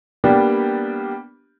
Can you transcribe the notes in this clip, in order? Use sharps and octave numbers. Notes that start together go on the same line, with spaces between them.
G3 A#3 B3 D4 G4